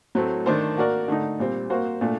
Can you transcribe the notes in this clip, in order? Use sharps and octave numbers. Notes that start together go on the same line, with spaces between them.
A2 F#3 A3 C4
D#3 A3 D4 A4 C5
A#3 F#4 A#4 D5
D3 A3 D#4
A#2 G3 C4
A#3 F#4 C5
A#2 A3 D4